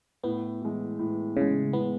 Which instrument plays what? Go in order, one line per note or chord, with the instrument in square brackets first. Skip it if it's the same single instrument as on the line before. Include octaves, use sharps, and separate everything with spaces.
[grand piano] A2 [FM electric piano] B3
[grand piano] E3 G#3
A2
[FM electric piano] C#3 [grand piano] E3 G#3
[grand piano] A2 [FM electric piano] B3